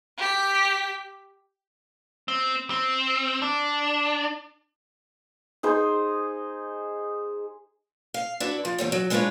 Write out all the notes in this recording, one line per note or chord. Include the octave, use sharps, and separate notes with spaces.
G4 B6
C4
C4
D4
D#4 G#4 C5
F5
D4 E4 F#4 B4
F3
E2 G3 C#5
F#3
G#3 B3 D4 F4 B4 C#5